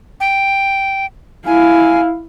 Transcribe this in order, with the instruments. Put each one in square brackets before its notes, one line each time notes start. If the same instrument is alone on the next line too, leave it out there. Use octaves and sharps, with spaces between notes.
[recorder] G5
[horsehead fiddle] E4 F5 [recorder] G#5